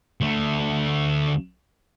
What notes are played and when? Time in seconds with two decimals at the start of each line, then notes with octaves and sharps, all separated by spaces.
0.21 D2 A3